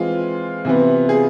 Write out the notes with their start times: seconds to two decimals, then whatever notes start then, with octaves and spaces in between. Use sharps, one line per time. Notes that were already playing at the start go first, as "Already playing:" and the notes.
Already playing: E3 G#3 C4 F4
0.65 C3 E3 B3
1.09 G#4